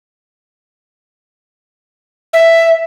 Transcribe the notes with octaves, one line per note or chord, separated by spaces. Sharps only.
E5